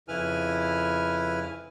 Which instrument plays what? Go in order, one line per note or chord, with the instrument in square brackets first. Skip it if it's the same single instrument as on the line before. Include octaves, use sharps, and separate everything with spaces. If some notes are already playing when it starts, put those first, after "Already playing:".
[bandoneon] F2 C#3 E4 B4 G#5 F6